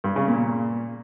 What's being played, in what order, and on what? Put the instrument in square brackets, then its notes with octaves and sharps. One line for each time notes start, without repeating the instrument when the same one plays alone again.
[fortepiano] G2
C#3
A#2